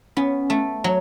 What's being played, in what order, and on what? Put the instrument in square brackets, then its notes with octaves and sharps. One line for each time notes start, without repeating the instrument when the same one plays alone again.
[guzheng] B3 [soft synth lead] C#4
[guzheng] A3
F#3